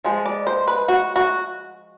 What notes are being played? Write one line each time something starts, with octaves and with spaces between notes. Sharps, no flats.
F3 G#3
D5
C5
B4
F#4
F#4